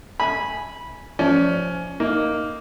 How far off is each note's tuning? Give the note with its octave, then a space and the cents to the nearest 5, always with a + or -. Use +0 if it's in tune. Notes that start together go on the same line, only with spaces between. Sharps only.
G#5 +0 B5 -15
F3 +0 C#4 +15 D5 +0
A#3 +0 D#4 +0